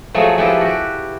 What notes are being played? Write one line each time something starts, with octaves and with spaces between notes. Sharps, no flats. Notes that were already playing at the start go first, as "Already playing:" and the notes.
F3 F#3 G#3 A3
F3 G#3 E4 G4 A4 B4
F#4 G4